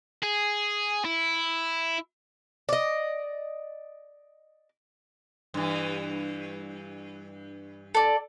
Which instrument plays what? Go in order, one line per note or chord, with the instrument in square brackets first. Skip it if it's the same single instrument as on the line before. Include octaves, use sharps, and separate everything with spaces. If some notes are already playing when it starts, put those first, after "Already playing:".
[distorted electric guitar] G#4
E4
[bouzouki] D5 D#5
[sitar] G2 E3
[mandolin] A4 D5